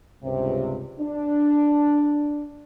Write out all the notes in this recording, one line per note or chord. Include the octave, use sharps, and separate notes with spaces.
C#2 G2 C3
D4